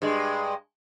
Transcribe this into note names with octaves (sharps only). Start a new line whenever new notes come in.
G2 G#3